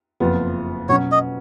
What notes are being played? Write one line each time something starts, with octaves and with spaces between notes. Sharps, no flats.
F#1 F2 F3 B3 F4
B2 F#3 C#4 C#5
D#5